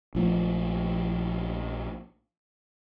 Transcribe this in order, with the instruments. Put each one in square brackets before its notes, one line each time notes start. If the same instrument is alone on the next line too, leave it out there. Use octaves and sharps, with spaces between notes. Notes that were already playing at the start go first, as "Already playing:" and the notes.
[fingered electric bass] A#1 F3 A3